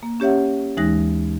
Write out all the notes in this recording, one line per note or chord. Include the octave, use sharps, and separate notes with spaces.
A#3
C#4 G4 C#5 E5 F#5
D#2 E3 G#3 D#4 F#6 A#6